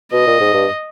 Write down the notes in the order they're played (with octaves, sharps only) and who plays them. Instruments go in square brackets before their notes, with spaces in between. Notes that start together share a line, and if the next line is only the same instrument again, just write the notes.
[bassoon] B2 [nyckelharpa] D#5
[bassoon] A#2
G#2
G2